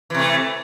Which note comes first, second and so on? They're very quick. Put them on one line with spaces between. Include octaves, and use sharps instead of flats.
E3 C3 A3